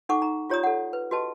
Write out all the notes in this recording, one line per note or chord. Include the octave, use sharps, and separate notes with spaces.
D#4 A4 F#5 C#6 D6
D#4 A#5
F4 G4 C#5 D5 A#5 D#6
A4 F#5
B4
F#4 G4 B4 D#5 A5